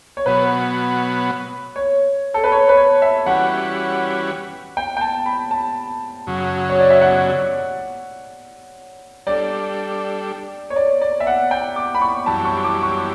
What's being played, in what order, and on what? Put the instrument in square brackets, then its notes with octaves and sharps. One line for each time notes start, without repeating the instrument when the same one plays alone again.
[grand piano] C#5
[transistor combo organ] B2 F#3 B3 [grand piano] B4
[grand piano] C#5
A4
B4
C#5
B4
C#5
E5
[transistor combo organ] E3 G3 C#4 F#4 B4 [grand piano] F#5
[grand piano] G5
G5
A5
B5
A5
[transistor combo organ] F#2 C#3 F#3
[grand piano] C#5
D5
E5
F#5
[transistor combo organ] G3 D4 A4 [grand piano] D5
[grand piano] C#5
D5
D5
E5
F#5
G5
D6
B5
C#6
[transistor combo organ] F#2 E3 G3 [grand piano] A5
[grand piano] C#6
D6
C#6